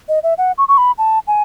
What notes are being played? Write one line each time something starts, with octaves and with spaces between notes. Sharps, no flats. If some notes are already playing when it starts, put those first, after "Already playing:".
D#5
E5
F#5
C#6
C#6
B5
A5
G#5